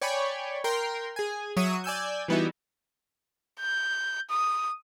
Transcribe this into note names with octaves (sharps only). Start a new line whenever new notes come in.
C#5 D5 G5 G#5 B5 C#6
A#4 G5 C6
G#4 G#5
F#3 E5 C#6 D#6 G#6 D#7
D5 G#5 E6 G6
E3 G3 B3 D#4 E4 F#4
G6
D#6